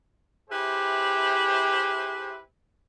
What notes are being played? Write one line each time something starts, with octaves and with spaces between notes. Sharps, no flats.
E4 G4 G#4 B4 C5 E5